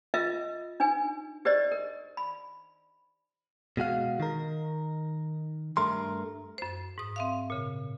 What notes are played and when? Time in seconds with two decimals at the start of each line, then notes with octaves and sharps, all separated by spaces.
0.14 F4 A#4 B4 D#5 E5
0.80 D4 D#4 B4 G#5
1.45 G4 B4 C5 D5 D#5
1.72 A#4
2.17 B5
3.77 B2 G#3 F#4 F5
4.20 D#3 A#4
5.77 G2 A3 A#4 C6
6.58 F#2 C5
6.98 G#2 D#6
7.16 C4 E5 F5
7.50 A#2 C#3